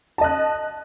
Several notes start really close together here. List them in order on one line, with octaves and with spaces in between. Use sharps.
A5 D#5 F#6